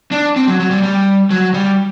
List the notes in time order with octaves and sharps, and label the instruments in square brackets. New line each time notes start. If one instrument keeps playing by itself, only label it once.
[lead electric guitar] D4
C4
F#3
F#3
G3
G3
F#3
G3